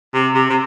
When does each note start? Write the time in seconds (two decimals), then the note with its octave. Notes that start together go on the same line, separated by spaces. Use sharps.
0.14 C3
0.35 C3
0.50 C3